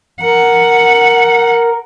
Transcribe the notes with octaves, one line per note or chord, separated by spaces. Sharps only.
A#4 F#5